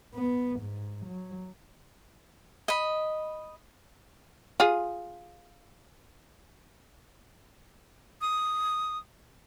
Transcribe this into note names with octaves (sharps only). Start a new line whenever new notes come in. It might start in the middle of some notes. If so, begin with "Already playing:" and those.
B3
G#2
F#3
D#5 B5
F4 G#4
D#6